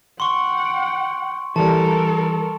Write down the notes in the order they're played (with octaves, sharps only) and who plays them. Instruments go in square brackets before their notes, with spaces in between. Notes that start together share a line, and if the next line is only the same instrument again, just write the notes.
[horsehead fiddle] F#5 G5 [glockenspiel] C6 C#6
[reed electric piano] E3 G3 [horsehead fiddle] A4 A#4 [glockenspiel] A5